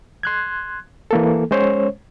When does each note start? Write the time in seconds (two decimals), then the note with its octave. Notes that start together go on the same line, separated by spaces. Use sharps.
0.23 C6 F#6 G#6
1.11 E3 A#3 A4
1.51 G#3 C#4 C5 C#5